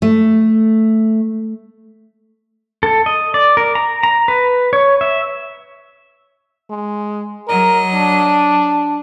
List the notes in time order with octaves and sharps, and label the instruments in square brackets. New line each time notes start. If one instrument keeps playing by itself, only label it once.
[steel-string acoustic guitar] A3
[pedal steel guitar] A4
D#5
D5
A#4
A#5
A#5
B4
C#5
E5
[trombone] G#3
[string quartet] F#3 D#5 [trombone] A#4
[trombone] D4